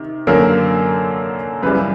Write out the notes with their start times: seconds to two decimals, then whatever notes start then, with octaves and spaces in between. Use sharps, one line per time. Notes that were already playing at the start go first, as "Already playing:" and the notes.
Already playing: C3 D#3
0.27 F#2 D3 F#3 A#3 A#4
1.63 F#2 C#3 E3 G3 B4